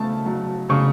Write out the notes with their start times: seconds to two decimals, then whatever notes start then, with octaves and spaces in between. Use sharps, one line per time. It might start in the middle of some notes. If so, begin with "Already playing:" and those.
Already playing: C#3 A3 A5
0.26 F#3
0.69 C#3 C#6